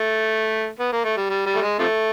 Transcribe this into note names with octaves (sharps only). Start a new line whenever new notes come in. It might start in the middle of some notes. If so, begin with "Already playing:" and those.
Already playing: A3
B3
A#3
A3
G3
G3
G3
A3
G#3
C3 F3 A3